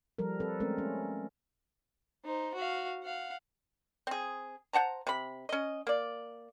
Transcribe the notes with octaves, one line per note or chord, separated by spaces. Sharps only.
F3 G3 A4 A#4
C4 A4 B4
G#3 A3 C4 C#4 A#4
C#4
D#4 C5
F#4 F5
F5 F#5
C4 G#4
C5 F#5 A5 A#5
C3 B5
C#4 D#5
A#3 D5